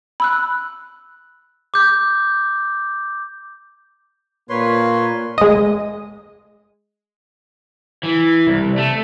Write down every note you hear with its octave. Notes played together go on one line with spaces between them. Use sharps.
B5 E6 F#6
D6 G6
A#2 A#3 B4 C#5 C6
G#3 D#5
E3
C2
A3